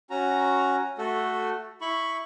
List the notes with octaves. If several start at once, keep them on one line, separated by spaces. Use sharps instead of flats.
C#4 F#4 A#5
A3 F#4 A4
E4 B5 C#6